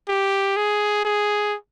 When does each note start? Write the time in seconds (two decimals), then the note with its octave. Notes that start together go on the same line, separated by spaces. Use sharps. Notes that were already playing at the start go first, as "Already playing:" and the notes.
0.08 G4
0.57 G#4
1.04 G#4